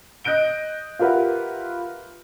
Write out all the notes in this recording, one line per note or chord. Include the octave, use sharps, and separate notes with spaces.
D#5 F#6 G6 D7 G7
F4 G4 A#4 B4 E5 F#5